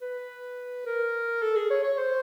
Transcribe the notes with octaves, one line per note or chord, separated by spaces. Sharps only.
B4
A#4
A4
G#4
C#5
C#5
C5